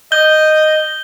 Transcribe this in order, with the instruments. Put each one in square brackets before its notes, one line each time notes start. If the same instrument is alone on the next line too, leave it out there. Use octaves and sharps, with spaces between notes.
[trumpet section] D#5 [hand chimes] G6 [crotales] G7